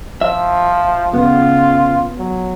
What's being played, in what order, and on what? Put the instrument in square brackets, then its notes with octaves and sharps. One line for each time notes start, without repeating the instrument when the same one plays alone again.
[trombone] F3 [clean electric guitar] E5
[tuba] C#3 [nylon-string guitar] B3 [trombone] F4
[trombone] F#3